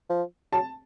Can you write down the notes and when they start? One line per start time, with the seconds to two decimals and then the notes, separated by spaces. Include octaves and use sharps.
0.10 F3
0.53 F#3 A5